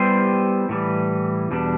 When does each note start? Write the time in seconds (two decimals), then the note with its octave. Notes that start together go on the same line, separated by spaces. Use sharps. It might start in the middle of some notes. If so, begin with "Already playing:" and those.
Already playing: G3 B3 E4 G4 C5
0.69 A2 E3 G3
1.51 E2 B2 G3 D4